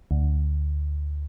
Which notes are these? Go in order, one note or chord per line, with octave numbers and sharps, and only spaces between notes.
D2